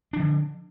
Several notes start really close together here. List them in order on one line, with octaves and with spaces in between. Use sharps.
D4 F3 D3